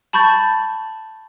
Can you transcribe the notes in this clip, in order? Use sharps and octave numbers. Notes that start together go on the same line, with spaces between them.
A5 B5 C#6 G6 A6